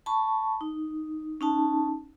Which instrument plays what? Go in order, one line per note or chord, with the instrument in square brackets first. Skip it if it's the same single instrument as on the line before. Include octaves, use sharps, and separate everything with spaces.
[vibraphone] A5 B5 C#6
D#4
C#4 D#4 A5